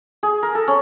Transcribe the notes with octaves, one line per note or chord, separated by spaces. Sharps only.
G#4
A#4
A4
C#4